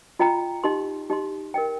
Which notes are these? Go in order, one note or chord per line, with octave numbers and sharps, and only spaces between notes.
F4 D#5 G5 A#5
D#4 G4 D#5 C6
D#4 G4 D#5 C6
A#4 D#5 G5